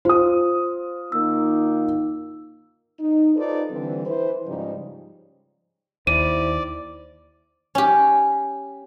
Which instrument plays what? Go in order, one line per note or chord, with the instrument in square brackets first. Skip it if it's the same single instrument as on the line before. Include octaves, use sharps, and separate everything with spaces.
[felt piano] F4 D#6 [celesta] C5
[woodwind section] D#3 A#3 D#4 [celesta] E6
[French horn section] D#4
D#4 F4 A4 B4 C5 D5
D3 E3 G3 C4
E3 B4 C5
G#2 C#3 F3 G3 D#4
[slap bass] D#2 [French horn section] E4 C5 [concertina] D5 [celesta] D#7
[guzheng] C#4 G4